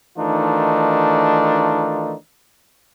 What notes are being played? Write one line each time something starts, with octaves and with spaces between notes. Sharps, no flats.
D#3 E3 A3 D4 D#4 F4